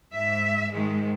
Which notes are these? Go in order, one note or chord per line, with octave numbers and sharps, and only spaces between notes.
G#2 E5
G#2 D#3 G#3